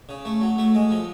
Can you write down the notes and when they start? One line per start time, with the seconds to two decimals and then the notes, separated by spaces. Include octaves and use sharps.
0.09 C#3
0.25 A3
0.41 F#3
0.58 A3
0.75 G#3
0.91 F3